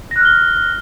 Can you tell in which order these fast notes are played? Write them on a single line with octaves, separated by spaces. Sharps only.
A#6 F#6 F6 G7